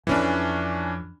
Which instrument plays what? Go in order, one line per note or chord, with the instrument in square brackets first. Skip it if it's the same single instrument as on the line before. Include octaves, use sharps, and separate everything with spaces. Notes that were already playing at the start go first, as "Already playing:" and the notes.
[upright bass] F2 [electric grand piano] E3 C#4 D4